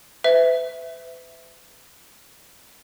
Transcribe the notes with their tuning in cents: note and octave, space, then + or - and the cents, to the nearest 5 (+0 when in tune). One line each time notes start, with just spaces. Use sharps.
B4 +40 E5 +0